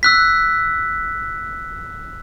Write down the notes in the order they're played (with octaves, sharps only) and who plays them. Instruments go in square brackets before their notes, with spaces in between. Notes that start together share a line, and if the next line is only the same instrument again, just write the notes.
[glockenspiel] E6 F#6 B6